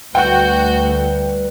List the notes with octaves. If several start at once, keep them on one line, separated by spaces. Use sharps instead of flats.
D2 G3 F#4 B4 F#5 G5 G6